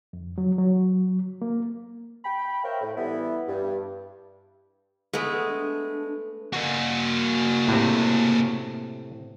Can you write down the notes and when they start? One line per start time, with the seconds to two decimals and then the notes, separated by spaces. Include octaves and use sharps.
0.13 F2
0.38 F#3
0.58 F#3
1.42 A#3
2.25 G5 B5
2.64 A#4 C5 C#5 E5 F5 G5
2.81 A2
2.97 E3 G3 B3 E4
3.47 G2
5.13 G#3 A3 B3
5.49 D4
6.53 A#3 F#4
7.68 A2 C3